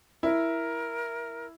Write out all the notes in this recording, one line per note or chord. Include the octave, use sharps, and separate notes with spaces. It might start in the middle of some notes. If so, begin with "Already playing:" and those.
E4 A#4